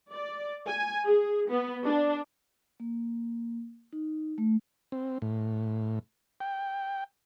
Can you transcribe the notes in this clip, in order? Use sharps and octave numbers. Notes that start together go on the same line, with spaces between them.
D5
G#5
G#4
B3
D4
A#3
D#4
A3
C4
A2
G5